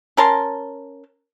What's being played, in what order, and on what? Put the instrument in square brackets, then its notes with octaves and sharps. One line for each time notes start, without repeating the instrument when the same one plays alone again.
[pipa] C#4 A#4 A5 C6